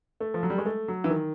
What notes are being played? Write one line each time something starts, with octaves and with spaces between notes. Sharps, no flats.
A3
F3
F#3
G3
G#3
A3
F#3
E3
D#3